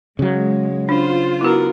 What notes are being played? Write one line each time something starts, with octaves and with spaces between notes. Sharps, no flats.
C#3 F#3 G#3
D4 F4 C5
B3 E4 F#4 A#4